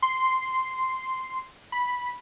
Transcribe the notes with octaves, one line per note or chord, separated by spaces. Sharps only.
C6
B5